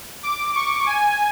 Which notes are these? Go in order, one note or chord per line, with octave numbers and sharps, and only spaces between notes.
D6
C#6
G#5